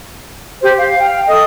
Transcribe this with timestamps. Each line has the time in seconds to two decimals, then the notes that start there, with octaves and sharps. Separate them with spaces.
0.62 G4 C5
0.77 F5
0.98 F5 G5
1.27 A4 D#5 D#6